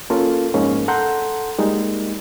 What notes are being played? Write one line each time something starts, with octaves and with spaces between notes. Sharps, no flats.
A#3 C#4 F4 A4
F2 G#2 G#3 A#3 C#4
A4 F#5 A#5 C6 G6
G3 G#3 A#3 D#4